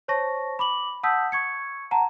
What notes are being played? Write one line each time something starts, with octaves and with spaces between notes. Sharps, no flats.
C5 C#5 A5 C#6 A#6
B5 D6 F#7
F#5 A5 D#6 E6 G6 B6
C#6 G#6 C#7
F#5 A5 A#5